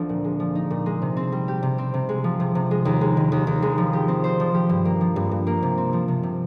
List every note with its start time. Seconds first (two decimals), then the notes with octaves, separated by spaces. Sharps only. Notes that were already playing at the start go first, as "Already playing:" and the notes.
Already playing: D2 F3 C4
0.09 A#2
0.24 G#3
0.40 F3
0.55 D#4
0.70 A#2
0.86 G#3
1.02 C3
1.17 C4
1.32 G3
1.48 G4
1.63 C3
1.78 C4
1.94 C3
2.09 G#3
2.24 F3
2.40 C3
2.55 C3
2.71 G#3
2.85 D#2
3.01 G#3
3.17 D#3
3.32 D#2
3.47 D#2
3.62 G#3
3.78 F3
3.93 G4
4.08 C4
4.24 C5
4.40 F3
4.54 G4
4.69 G2
4.85 A#3
5.01 F3
5.16 G2
5.31 G2
5.47 A#3
5.63 C3
5.78 C4
5.93 F3
6.08 C3
6.23 C3